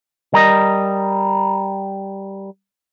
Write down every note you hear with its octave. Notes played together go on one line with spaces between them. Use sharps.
G3 A#4 D#5